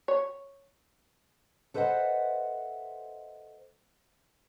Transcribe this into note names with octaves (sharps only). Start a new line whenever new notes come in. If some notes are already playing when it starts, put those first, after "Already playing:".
C#5
A4 B4 C5 D#5 E5 F#5